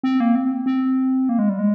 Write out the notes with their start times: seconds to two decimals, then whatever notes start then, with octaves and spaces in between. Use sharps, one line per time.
0.03 C4
0.20 A#3
0.35 C4
0.66 C4
1.29 A#3
1.39 G#3
1.49 G3
1.59 G#3